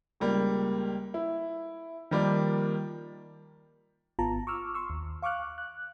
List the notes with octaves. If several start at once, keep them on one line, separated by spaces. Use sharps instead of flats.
C#2 G3 A#3
E4
D#3 F3 G3 A#3 D5
G#1 B3 F4 A5 A#5
C#6 D6 E6 F6
C6 C#6 E6
D#2
F5 C#6 D6 F6 F#6
F#6